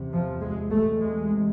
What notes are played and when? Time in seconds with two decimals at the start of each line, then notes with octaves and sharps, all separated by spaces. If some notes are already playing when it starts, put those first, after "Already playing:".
Already playing: E2 C3
0.12 F3
0.41 G#3
0.70 A3
0.99 E2 C3 G#3